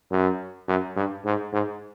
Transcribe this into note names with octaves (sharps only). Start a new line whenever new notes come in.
F#2
F#2
G2
G#2
G#2